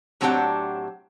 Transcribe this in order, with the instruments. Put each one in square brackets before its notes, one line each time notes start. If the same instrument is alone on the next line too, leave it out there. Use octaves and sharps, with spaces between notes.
[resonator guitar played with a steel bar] A2 F#3 C4 D4 G4 F#5